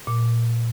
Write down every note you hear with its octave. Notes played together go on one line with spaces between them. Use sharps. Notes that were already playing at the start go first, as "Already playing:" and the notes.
A#2